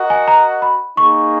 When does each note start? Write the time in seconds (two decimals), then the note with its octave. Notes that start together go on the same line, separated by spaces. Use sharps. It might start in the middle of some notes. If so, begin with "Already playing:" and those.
Already playing: F#4 A#4 D#5 F#5
0.10 G#5
0.28 A#5
0.62 B5
0.97 A#3 D#4 G#4 C#6